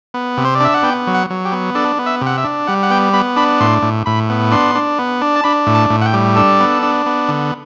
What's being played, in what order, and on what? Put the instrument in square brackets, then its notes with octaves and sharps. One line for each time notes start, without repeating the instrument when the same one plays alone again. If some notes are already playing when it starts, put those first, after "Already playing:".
[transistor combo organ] B3
C3
C5
D5
D4 E5
F#5
B3 G5
F#3
F#5
F#3
G4
B3
D4 A4
B3
E5
C3
F#5
E5
D4
G3 F#5
F#5
B3 G5
B3 B5
D4 B5
A2 C6
A2
A2 B5
B3
D4 C6
D4
B3
D4
A5
D4 B5
A2
A5
A2
F#5
G5
G3
D4 A4
B3
D4
B3
D3